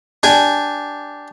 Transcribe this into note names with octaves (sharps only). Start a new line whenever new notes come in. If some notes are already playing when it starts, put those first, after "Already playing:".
D4 G4 G#5